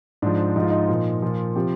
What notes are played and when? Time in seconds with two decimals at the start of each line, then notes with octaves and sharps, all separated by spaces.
0.22 G#2 F3 D4
0.56 G#2 F3 D#4
0.63 F4
0.70 D#4
0.89 A#2 F3
1.22 A#2 F3 F4
1.56 C3 F3 G4